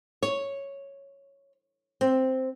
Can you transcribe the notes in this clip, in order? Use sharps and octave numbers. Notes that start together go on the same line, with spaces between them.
C#5
C4